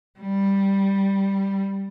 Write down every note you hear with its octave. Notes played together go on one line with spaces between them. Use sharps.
G3